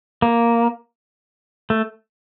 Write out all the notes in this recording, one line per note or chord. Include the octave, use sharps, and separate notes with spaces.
A#3
A3